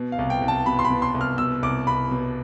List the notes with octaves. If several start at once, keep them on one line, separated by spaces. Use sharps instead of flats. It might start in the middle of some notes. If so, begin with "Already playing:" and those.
Already playing: B2
F5
C2
G5
C2
A5
B2 B5
C6
B5
B2
C6
C2
F6
B2 E6
C2 D6
C2 B5
B2